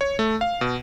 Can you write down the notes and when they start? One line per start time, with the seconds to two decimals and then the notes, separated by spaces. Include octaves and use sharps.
0.01 C#5
0.19 A3
0.41 F5
0.61 B2